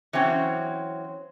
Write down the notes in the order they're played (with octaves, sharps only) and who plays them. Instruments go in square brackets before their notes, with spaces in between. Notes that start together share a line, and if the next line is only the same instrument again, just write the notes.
[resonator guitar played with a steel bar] E3 F#3 C4 C#4